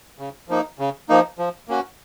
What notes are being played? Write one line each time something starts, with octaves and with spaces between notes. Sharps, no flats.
C#3
F3 A#3 D#4
C#3
F3 A#3 D#4
F3
A#3 C#4 F#4